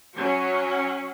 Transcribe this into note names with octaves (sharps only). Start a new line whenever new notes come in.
F#3 C#4